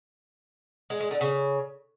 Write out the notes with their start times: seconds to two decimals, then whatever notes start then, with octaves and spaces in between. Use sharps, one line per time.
0.90 G#3
1.00 G#3
1.11 D3
1.21 C#3